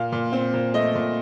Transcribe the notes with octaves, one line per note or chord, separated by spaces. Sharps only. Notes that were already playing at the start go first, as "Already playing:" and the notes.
Already playing: A#2 F5
A#2
C4
A#2
A3 D#5
A#2